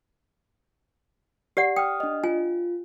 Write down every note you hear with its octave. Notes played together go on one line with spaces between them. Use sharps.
G4 D5 F#5
G5 D#6 F6
D4 D#5
F4 G#5